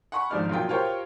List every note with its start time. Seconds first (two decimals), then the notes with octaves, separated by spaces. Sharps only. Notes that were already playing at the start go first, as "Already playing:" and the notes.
0.12 F#5 G#5 B5 C#6
0.30 G#1 G#2 F3 D4 D5 F6
0.49 B1 A#2 F4 G5
0.69 F4 G4 A#4 C5 C#5 G5